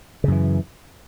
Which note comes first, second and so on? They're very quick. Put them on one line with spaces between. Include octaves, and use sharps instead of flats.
C#3 F#2 E3